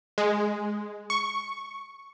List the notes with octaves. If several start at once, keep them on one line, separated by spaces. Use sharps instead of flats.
G#3
C#6